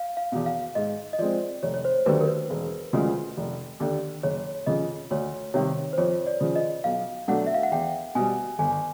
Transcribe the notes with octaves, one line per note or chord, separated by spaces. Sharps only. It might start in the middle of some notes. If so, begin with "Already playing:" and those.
Already playing: F5
F5
E2 B2
F5
G#2 D#5
D#5
F3 G#3 C4 D5
F1 C#5
C#5
C5
D#2 D3 F#3 A3 B4
A#4
B4
E1
D2 C#3 F3 G#3
F1
D#2 D3
F#1 C#5
F2 C#3 D#5
D2 C#5
C3 D#3 G3 C#5
C5
F2 C#5
D5
C#3 F3
D#5
B1 F5
B2 F#3 A3 D4 F#5
E5
F5
F#5
E2 G5
B2 G3 G#5
G1 G#5